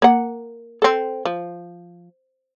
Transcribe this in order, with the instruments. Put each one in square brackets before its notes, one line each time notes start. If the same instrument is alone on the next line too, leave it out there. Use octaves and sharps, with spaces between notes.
[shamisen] A#3 F#5
C4 A4
F3